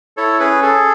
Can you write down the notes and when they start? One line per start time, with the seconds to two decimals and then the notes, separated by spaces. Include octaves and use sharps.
0.17 E4 A4 C#5
0.40 C#4 G#4 B4
0.62 G#4 A4